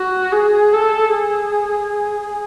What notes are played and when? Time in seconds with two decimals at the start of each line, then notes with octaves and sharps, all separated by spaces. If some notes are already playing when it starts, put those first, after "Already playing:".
Already playing: F#4
0.32 G#4
0.73 A4
1.13 G#4
1.93 G#4